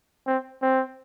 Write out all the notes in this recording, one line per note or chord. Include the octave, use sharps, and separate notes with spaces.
C4
C4